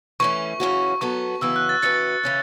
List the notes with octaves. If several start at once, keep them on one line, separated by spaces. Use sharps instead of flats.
E3 A3 C#4 C#6
F#2 C#3 E3 C#4 F#4
F#3 B3 A4 C#6
F#2 C#3 E3 B3 F#4 E6
F#6
A6
A2 E3 C#4 F#4 B4 A6 C#7
C#3 E3 C#4 E4